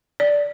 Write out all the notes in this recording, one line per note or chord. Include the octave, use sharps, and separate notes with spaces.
D5